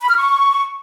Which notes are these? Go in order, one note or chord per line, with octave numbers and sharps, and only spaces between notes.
B5
F6
C#6